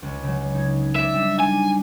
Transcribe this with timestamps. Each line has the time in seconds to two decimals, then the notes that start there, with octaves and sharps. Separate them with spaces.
0.02 C#2
0.23 C#3 F#3
0.54 D#4 G#6
0.96 D5 E5
1.14 G3 D4 D#4
1.40 G3 G#5